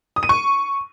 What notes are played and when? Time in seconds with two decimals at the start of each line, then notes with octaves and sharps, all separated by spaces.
0.16 D#6
0.23 D#7
0.29 C#6